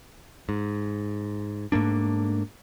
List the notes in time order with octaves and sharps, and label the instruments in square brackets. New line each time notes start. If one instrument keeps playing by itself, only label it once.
[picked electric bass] G#2
G#2 A3 A#3 D4